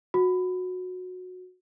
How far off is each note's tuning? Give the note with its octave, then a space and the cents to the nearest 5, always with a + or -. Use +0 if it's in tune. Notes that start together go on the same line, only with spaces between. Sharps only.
F#4 -15